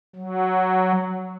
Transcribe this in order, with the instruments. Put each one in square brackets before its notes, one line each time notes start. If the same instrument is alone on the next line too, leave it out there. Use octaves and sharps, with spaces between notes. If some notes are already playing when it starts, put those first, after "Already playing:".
[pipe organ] F#3